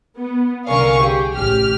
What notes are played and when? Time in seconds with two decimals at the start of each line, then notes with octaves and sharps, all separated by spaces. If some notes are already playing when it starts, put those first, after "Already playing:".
0.17 B3
0.69 C2 D3 A#4 F5 G#5 C#6
1.01 G4 G#4
1.34 A1 A2 G4 F6